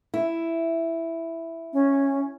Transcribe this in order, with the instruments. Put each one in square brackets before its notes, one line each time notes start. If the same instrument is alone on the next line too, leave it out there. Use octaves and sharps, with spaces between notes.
[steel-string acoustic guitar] E4
[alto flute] C#4